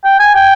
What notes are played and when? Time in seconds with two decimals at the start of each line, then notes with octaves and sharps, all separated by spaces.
0.04 G5
0.19 G#5
0.34 G5